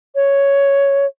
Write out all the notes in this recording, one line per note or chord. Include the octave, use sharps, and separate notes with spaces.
C#5